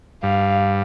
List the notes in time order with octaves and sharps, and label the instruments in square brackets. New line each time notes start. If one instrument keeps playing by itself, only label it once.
[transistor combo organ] G2 [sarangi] F5